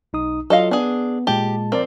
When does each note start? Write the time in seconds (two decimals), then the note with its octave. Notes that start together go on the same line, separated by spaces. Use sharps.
0.13 B1 D#4 D#6
0.50 F#3 F4 A4 D#5 F5
0.71 B3 D4 G#4
1.27 A#2 G#3 G4 A5
1.72 F3 C4 A#4 C5 D5